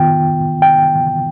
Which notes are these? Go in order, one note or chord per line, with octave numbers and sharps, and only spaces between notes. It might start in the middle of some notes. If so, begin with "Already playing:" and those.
Already playing: D#3 B3 F4 G5
G5